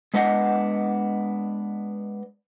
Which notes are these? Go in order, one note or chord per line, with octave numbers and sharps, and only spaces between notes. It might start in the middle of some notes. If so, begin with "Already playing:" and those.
G#3 B3 D4 D#5 F#5